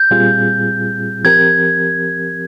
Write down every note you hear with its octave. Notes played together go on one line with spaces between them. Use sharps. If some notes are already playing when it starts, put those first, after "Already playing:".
Already playing: G6
A#2 G3 C4 F4 G#4
F3 C4 G4 A#4 G#6